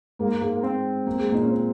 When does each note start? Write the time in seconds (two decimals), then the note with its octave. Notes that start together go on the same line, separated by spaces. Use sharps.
0.19 G#2 G#3 A#3
0.41 G#2 G#3
0.56 A#3
0.63 C4
1.07 A#3
1.19 G#3
1.32 A#2 A#3 D#4
1.43 C#4
1.50 C4